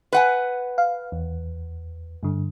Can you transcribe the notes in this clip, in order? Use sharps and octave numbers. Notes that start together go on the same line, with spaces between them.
B4 F#5 G#5
F5
E2
G2 D3